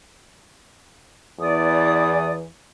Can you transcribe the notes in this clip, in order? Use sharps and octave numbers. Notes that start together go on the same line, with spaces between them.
E2 E3 D5 D#6